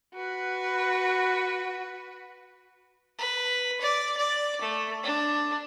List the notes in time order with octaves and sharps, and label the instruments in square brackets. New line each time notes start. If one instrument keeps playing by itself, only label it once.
[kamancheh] F#4 B4
[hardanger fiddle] B4
D5
D5
A3
D4